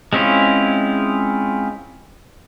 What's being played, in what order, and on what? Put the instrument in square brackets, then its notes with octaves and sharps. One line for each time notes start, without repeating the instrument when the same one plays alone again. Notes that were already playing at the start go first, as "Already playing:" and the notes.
[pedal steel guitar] G#3 C4 C#4 E4 F4